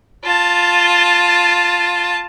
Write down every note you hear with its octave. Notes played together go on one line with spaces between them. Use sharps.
F4 A5